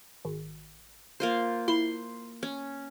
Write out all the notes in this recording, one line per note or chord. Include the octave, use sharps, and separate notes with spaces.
G#1
A#3 F4 C5
E4 C6
C#4